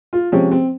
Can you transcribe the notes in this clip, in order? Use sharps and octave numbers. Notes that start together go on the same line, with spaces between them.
F4
C3 F3 G#3 C4 C#4
C4